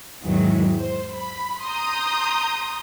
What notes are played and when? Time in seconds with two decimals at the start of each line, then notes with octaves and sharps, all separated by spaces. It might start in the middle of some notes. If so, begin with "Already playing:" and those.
0.24 E2 G#2 D#3 E3 F#3
0.78 C5
1.14 B5
1.63 A#5 C6 D#6 G6